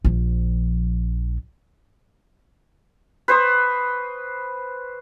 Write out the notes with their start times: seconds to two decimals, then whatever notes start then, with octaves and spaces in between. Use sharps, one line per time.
0.05 A#1 F3
3.28 B4 C5 C#6 D#6